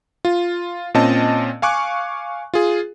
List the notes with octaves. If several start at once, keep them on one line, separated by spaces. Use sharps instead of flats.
F4
A#2 C4 C#4 D#5 A5
F5 G#5 C#6 D6 F#6
F4 G#4